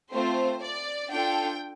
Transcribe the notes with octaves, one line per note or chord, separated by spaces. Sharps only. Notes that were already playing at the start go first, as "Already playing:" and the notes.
A3 C4 F4 C5
D5
D4 F4 A4 G5